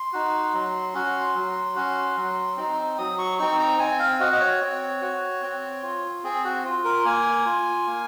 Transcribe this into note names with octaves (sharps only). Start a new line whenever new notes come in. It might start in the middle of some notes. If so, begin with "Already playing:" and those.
Already playing: C6
D#4 F#4
F#3
C#4 F#4
F#3
C#4 F#4
F#3
C4 D#4
F#3 D#6
C#6
C4 D#4 C#6
A#5
C4 G#5
F5
F#4 D#5
D#5
C#5
C4
F#4
C4
F4
C4 G#4
F#4
F4
A#4
A#3 G#5
F4
A#3